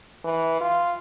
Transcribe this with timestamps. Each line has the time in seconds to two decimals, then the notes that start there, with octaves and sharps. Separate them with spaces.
0.24 E3
0.61 F4